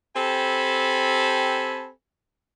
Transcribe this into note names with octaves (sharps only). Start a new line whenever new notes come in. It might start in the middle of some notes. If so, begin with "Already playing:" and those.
C4 G4 A4 G#5 A5 B5